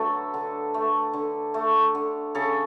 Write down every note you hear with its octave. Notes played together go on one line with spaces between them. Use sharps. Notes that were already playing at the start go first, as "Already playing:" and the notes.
Already playing: D3 F#3 A3 A4 B4
D3
A3
D3
A3
D3
C#3 A4